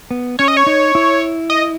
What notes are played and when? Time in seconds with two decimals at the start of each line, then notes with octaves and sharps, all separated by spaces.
0.11 B3
0.39 C#4 C#5
0.48 D#5
0.57 C#5
0.67 D#4
0.95 E4
1.50 D#5